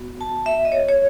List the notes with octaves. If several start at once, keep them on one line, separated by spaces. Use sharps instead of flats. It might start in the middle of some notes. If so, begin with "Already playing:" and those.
Already playing: B3 F#4
A5
E5
D#5
C#5
C#5